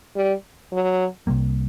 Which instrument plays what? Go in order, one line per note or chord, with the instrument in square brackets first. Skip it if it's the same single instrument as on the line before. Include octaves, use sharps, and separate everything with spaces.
[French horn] G3
F#3
[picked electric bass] C2 C3 G3 A#3